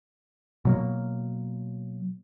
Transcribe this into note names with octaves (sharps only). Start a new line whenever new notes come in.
B2 F#3 A#3